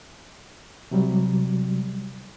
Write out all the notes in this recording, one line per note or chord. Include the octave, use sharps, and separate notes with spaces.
C3 F#3 G3